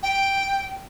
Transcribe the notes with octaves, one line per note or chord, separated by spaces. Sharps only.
G5